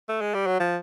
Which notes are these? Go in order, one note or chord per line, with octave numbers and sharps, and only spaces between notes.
A3
G#3
G3
F#3
F3